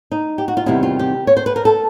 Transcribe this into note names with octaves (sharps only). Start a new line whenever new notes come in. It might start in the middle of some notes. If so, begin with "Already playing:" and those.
D#4
G4
F#4
F4
E2 C3 D#3 G3 E4
F4
G4
C#5
C5
B4
A#4
A4